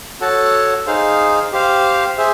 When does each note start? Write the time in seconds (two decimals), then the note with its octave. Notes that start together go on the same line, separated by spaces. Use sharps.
0.21 F#4 A4 C#5 F#5 A5
0.87 D#4 G#4 C5 F5
1.52 G4 C5 F5
2.18 G#4 C5 E5